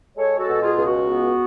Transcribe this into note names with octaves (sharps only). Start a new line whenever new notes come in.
G#3 A4 C#5
F#4 A4
B2
F4 G#4
C#2 G#4
F#4
B3